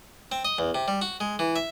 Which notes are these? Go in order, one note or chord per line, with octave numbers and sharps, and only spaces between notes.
C4
D#5
E2
C3
G3
F#4
G#3
E3
E5